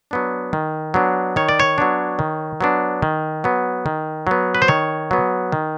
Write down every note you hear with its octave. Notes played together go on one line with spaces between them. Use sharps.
F#3 B3 D4
D#3
F#3 B3 D4
D#3 C#5
D5
C#5
F#3 B3 D4
D#3
F#3 B3 D4
D#3
F#3 B3
D#3
F#3 B3
B4
C5
D#3 C#5
F#3 B3
D#3